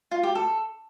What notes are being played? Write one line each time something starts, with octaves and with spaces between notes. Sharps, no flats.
F4
G4
A4